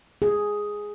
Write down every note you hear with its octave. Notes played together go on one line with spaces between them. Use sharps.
G#4